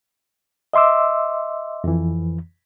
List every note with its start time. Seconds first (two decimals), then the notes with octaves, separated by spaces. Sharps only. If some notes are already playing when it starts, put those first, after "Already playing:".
0.74 D#5 E5 C6 D6 E6
1.84 F2 E3